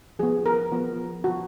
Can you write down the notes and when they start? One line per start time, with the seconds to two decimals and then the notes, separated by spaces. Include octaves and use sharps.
0.19 F3 B3 G#4
0.46 A#4
0.72 F3 B3
1.24 F3 B3 F#4